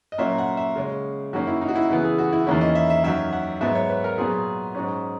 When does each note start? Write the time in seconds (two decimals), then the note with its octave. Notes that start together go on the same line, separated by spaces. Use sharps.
0.12 D#5
0.18 A#2 F#3 A#3 C#4 E5
0.38 F#5
0.57 E5
0.76 C#3 G#3 C#4
1.33 F#2 D#3 F#3 A#3 C#4 F#4
1.47 E4
1.61 D#4
1.68 F#4
1.75 E4
1.89 C#3 E3 B3 E4
2.04 G#4
2.18 F#4
2.33 E4
2.47 E2 D#3 A#3 C#4 E4
2.61 D#5
2.75 E5
2.90 E5
3.04 F#2 D#3 F#3 E5
3.33 F#5
3.61 G#2 F#3 B3 E5
3.75 C#5
3.89 B4
4.04 A#4
4.18 A#2 F#3 B3 G#4
4.75 G#2 F#3 C#4